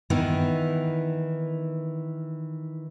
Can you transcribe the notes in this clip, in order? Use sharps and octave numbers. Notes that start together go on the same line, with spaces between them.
D#3 E3 B3 D#4